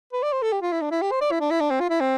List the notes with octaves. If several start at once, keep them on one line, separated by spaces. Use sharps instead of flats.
B4
D5
C5
A4
G4
F4
E4
D4
E4
G4
C5
D5
E4
D4
E4
D4
C4
F4
E4
C4